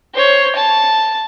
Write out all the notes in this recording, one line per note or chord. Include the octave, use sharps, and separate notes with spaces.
C5 C#5
A5